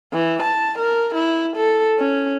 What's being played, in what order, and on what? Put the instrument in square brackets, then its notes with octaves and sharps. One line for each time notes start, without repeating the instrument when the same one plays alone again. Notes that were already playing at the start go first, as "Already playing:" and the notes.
[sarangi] E3
A5
A#4
E4
A4
C#4